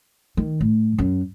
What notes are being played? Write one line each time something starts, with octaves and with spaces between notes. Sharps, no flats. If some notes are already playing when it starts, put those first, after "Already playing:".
D#3
A2
F#2